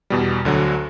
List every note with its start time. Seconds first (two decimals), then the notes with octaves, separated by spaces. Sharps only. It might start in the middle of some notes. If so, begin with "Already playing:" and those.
0.10 E2 B2 G3
0.45 D2 D3 F#3